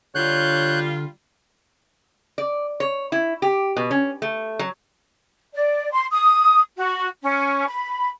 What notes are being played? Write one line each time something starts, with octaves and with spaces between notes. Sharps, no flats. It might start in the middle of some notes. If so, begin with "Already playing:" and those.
D3 G3 D4 F4 C#5 F#6 G6
D5
C#5
E4
G4
B2
C#4
A3
F#3
D5
C6
D#6
F#4
C#4
B5